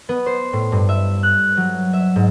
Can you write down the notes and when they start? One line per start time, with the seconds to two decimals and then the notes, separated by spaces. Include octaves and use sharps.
0.09 B3
0.26 C5
0.53 A2
0.72 G2
0.89 E5
1.23 F#6
1.57 F#3
1.93 E5
2.16 G#2